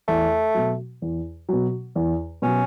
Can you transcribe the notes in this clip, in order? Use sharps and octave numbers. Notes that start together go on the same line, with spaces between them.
E2 A3
B2 F#3
E2
B2 F#3
E2
B2 F#3 C#4